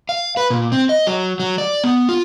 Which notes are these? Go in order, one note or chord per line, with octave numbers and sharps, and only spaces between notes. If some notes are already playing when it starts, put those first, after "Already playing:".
F5
B4
A#2
C4
D#5
F#3
F#3
D5
B3
F4